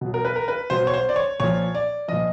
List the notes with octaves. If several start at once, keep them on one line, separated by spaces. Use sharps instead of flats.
B2 F#3
A#4
B4
A#4
B4
B2 F#3 C5
C#5
C5
D5
C#5
A#2 F3 C#5
D5
A#2 F3 D#5